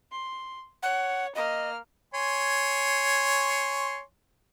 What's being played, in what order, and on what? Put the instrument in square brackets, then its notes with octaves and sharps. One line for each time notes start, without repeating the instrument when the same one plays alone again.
[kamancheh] C6
[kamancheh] C#5 [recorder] F#5
[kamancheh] A#3 F6 [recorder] D#5
[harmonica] C#5 G#5 C6